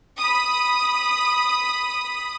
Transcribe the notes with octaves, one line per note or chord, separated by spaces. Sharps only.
B5 D#6